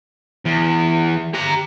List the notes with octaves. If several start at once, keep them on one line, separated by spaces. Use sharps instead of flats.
E2
G4 A#5